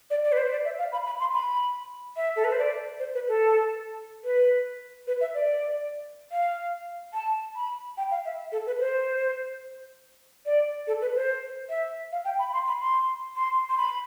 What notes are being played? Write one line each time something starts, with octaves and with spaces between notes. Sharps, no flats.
D5
D5
B4
C5
D5
E5
F5
B5
B5
C6
B5
E5
A4
B4
C5
D5
C5
B4
A4
B4
B4
E5
D5
F5
A5
B5
G5
F5
E5
A4
B4
C5
D5
A4
B4
C5
E5
F5
G5
B5
C6
B5
C6
C6
C6
B5